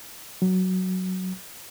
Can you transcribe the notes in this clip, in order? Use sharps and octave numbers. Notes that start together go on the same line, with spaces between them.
F#3